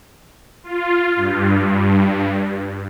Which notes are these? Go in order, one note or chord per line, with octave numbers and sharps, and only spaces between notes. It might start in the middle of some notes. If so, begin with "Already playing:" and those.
F4
G2